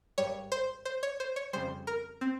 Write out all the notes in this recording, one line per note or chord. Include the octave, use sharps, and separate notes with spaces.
G#1 G2 G3 C#5
C5
C5
C#5
C5
C#5
F2 C#3 G3 C5
A#4
C4